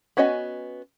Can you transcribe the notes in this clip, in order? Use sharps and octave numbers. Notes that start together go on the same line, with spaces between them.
B3 C#4 F#4 D#5 G#5